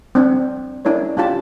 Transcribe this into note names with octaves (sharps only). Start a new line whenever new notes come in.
C4 D4
C#4 D4 E4 A#4 C#5
C#4 D4 F4 G4 A5